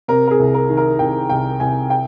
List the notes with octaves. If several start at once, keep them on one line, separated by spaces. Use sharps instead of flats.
C3 A#4
A#4
G#4
C2
A#4
D#3
A#4
C2 G5
C2 G5
C2 G#5
G5